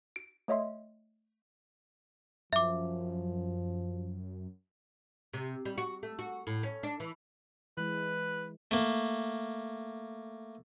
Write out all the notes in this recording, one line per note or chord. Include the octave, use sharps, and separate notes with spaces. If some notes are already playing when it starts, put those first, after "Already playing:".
D7
A3 C#5 D#5 E5 C6
F#2 F3 E5 D6
C3
G3
F#4
A3
F#4
A2
C#4
D4
E3
E3 G#3 B4
A3 A#3